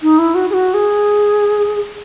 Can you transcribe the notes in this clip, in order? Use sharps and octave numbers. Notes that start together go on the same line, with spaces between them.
D#4
E4
F#4
G#4
F#4
G#4